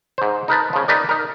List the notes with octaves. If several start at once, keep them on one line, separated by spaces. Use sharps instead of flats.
G#2 C5
D#4 A#4 B4 A5
C#3 F3
D#4 A#4 B4 D5
D#4 A#4